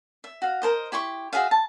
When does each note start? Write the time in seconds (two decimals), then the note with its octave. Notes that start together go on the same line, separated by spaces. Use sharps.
0.24 E5
0.42 F#4 F5
0.62 A#4 C5 D#5
0.92 E4 G4 C6 C#6
1.33 F#4 G#4 E5 F5
1.51 A5